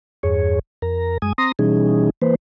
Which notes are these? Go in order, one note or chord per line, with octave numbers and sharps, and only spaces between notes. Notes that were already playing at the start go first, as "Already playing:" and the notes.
E2 G2 G#4 C#5
F2 A#4 A#5
F#2 G#3 G#5 D#6
C4 A#5 C6 D#6 A#6
B2 E3 G3 C#4 D#4 G#4
E3 A#3 B4 C5